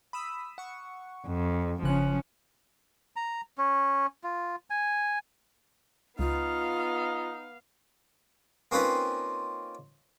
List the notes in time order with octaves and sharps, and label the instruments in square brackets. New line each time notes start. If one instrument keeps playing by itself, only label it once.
[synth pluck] B5 D#6 E6
F#5 C#6
[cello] F2
[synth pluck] G1 C#3 F#6 [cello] F3 C#4
[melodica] A#5
C#4
F4
G#5
[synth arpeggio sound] C#2 [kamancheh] B3 F5 [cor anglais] D#4 [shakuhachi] F4
[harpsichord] A#3 C4 C#4 D#4 F4 B4